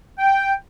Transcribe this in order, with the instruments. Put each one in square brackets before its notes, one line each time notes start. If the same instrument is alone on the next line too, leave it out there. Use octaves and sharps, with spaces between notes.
[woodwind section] G5